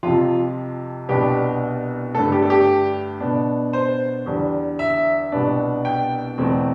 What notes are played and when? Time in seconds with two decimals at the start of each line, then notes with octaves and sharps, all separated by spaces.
0.03 F2 C3 F3 F4
1.09 C2 B2 B3 D4 G4
2.15 G2 D3 A3 A4
2.32 G4
2.42 A4
2.50 G4
3.20 B2 B3 D4
3.73 C5
4.26 E2 D3 G3
4.79 E5
5.32 C2 B2 B3 D4
5.85 G5
6.38 E2 B2 A3 C4